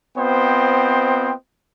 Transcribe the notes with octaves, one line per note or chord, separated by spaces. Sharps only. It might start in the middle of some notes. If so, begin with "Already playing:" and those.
B3 C4 F4 C5 D#5 G5